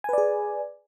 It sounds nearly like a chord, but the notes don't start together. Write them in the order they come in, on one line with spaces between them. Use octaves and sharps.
G#5 B4 D5 G#4